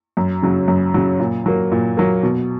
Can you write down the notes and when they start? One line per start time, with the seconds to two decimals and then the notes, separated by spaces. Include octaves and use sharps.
0.17 F#2
0.42 C#3 F#3
0.68 F#2
0.94 C#3 F#3
1.20 A#2
1.46 F#3 A#3
1.72 A#2
1.97 F#3 A#3
2.23 B2